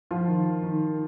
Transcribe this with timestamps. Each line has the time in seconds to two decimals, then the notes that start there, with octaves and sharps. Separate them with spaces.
0.11 F3 F4
0.28 D#3
0.63 D#3